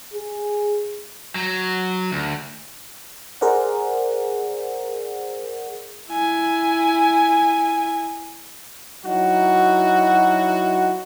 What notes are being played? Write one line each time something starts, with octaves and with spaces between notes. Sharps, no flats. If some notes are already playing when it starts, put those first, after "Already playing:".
G#4
F#3
D2
G#4 A#4 C5 D5 F#5
E4 G#5
F#3 D#4 E4 F#4